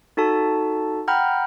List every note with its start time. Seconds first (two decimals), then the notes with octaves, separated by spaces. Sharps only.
0.17 D#4 F#4 A4 A5
1.08 F#5 G5 A#5 B5 F6 G6